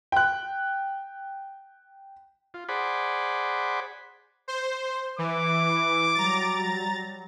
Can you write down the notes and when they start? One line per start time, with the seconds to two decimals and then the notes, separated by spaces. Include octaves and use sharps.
0.12 G5 F#6
2.54 F4
2.69 G#4 C5 D5 F#5 B5
4.48 C5
5.18 E3 D6
6.15 F#3 G3 A#5 A6